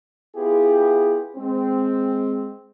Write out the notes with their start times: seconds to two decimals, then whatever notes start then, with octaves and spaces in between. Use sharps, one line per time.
0.36 B3 E4 F4 G4 G#4
1.36 G#3 C4